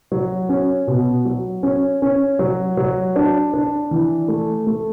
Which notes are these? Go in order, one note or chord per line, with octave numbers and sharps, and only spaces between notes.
F#3
C#4
B2
F#3
C#4
C#4
F#3
F#3
D4
D4
E3
A3
A3